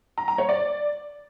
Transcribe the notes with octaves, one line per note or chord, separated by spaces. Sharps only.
A#5
A#5
C#5
D5